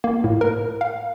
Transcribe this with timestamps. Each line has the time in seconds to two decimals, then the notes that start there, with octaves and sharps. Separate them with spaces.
0.04 A#3
0.24 A2
0.41 A#4
0.81 F5